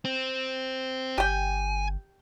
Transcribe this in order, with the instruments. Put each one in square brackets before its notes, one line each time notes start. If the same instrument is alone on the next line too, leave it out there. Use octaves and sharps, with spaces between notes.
[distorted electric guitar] C4
[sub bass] G1 [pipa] G4 G5 [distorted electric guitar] G#5